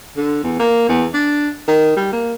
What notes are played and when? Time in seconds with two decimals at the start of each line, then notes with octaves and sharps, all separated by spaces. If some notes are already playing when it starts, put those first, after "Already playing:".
0.17 D3
0.43 E2
0.59 A#3
0.89 E2
1.14 D4
1.68 D#3
1.97 G3
2.13 A#3